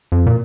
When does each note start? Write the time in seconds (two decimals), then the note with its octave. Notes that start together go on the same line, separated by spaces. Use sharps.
0.12 F2
0.26 A#2